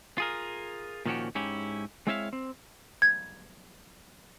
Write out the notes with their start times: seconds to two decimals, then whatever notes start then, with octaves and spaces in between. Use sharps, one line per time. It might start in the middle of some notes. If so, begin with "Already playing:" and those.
0.18 F4 G#4 A#4
1.06 A#2 D#3 F3 C#4 F#4 G4
1.35 G#2 C#4 E4 G4
2.07 G#3 C4 E4 C#5 E5 F5
2.33 C4
3.02 G#6